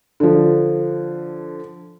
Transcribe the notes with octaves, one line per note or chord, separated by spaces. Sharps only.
D3 F3